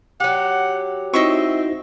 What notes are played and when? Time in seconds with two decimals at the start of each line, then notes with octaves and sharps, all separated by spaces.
0.20 F#3 G4 F#5
1.13 C4 D#4 E4 F#4 D#5 E5 C#6